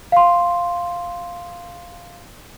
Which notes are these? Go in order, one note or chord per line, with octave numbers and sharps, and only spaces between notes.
F5 C6